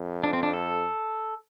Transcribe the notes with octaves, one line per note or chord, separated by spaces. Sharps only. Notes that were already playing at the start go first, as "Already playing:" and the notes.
Already playing: F2
D4
C4
D4
A4